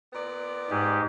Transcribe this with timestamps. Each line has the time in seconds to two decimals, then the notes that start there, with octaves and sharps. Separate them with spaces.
0.13 A#2 B3 D5
0.70 G#2 G#3 G4